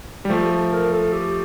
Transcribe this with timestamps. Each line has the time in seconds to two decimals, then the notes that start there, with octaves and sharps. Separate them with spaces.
0.24 G3 G4
0.30 F3 A3 A4
0.42 G4
0.51 A4
0.72 A#4
0.92 A4
1.13 G4